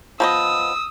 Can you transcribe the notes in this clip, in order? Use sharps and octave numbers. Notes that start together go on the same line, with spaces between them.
F3 B3 D#5 D#6 E6